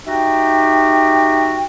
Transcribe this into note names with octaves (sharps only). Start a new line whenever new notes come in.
D#4 F#4 G4 E5 G5